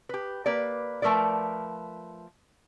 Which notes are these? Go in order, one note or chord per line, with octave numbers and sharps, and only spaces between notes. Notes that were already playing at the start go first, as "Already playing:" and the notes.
G4 B4
A#3 B4 D5
F3 A3 A#4 B4 D5